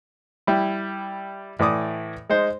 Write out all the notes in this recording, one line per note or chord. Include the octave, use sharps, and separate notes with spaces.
G3 E4
A2 E3 D5 D6 D#6
G#3 D#4 C5